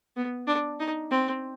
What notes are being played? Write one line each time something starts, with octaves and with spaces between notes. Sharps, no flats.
B3
D4
D#4
C4